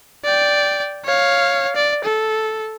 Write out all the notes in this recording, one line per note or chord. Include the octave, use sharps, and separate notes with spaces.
D5 G5
C#5 F5
D5
A4